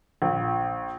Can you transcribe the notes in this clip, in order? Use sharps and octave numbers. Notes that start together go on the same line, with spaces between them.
A#1